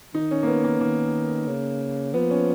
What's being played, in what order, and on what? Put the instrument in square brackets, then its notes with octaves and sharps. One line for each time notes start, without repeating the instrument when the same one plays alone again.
[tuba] D#3 [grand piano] D#4
[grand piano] C#4
A#3
B3
A#3
[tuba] D#3 [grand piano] A#3
[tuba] C#3
[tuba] F3 [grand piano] B3
[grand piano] C#4